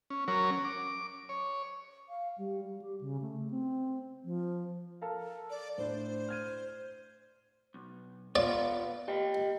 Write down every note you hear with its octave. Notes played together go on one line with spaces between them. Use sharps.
C#4
F#3 C#4 A#4 C#5
D6
C#5
F5
G3
G3
G4
C#3
A3
C4
F3
A4 A#4 F5
D5
A2 D4 C5
F6 G#6 D#7
B1
B3 F4 D5
G4 D#5 G5